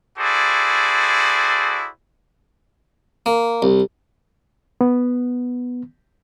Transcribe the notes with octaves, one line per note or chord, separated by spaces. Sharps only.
E4 F#4 G#4 A4 C5 D5
A#3
C2
B3